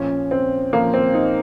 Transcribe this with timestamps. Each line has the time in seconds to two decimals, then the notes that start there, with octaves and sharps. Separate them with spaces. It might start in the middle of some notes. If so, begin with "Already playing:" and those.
Already playing: A#2 F3 C#4
0.31 C4
0.73 A#2 F3 A#3
0.94 C4
1.14 D#4